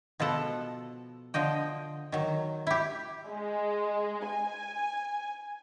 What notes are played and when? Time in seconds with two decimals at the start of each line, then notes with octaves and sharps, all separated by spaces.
0.20 B2 F3 B3 A4 F#5
1.34 D3 F3 D#5 G5
2.12 D#3 F#3
2.67 E4 G4
3.28 G#3
4.28 G#5